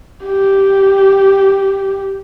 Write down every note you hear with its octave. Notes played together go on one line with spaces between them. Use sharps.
G4